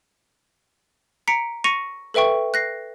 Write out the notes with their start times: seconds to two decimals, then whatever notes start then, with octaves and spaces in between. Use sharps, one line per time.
1.28 A#5 B6 C#7 D7
1.64 C#6 A#6 C#7 D#7 F7
2.14 A4 B4 E5 G5 C#6
2.54 F#6 A#6 C7